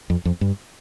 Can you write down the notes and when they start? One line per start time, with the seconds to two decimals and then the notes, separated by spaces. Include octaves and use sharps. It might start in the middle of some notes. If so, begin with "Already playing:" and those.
0.10 F2
0.25 F2
0.41 G2